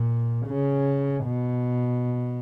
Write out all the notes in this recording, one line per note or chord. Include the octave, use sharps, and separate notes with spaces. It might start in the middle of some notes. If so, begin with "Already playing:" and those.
Already playing: A#2
C#3
B2